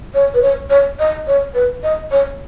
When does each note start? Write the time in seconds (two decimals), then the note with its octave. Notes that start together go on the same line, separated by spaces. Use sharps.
0.14 C#5
0.34 B4
0.42 C#5
0.70 C#5
0.99 D#5
1.27 C#5
1.54 B4
1.83 D#5
2.11 C#5